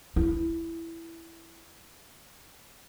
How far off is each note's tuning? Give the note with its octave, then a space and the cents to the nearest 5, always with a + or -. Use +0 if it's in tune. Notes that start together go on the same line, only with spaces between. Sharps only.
E4 +10